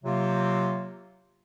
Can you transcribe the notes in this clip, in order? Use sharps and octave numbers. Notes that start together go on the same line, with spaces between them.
C3 F#3 A#3 F4